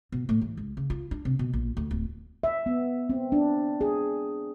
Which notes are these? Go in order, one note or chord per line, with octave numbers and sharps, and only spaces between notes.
B2
A2
E3
C#2
C#3
F4
D4
C3
B2
A#1
D2
D1
E5
B3
C4
D4
G#4